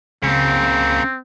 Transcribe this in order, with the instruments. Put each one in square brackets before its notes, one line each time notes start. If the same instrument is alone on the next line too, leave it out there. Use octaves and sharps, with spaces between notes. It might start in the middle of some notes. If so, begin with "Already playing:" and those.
[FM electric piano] C#2 [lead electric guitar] C#3 A#3 [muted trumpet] C4